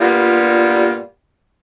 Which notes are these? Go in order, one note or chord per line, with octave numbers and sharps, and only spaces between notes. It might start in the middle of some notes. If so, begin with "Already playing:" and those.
G2 A#2 G3 A#3 B3 F4